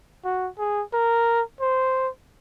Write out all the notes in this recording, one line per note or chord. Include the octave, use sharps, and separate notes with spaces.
F#4
G#4
A#4
C5